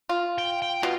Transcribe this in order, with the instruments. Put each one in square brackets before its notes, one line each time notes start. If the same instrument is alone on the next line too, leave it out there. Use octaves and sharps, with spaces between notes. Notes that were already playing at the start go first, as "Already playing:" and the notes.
[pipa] F4
[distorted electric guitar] G5
G5
[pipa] B2 [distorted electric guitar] F4